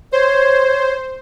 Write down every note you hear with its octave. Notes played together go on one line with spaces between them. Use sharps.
C5 C#5